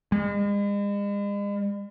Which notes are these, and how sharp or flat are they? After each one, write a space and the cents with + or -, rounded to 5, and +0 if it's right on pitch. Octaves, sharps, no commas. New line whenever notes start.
G#3 -40